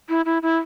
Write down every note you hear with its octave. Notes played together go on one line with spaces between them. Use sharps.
E4
E4
E4